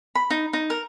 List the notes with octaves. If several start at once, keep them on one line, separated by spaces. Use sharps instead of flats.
B5
D#4
D#4
A#4